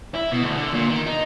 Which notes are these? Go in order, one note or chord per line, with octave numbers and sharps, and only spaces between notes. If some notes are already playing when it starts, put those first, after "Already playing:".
E4
B2
D2
D3
A#2
D#3
D#4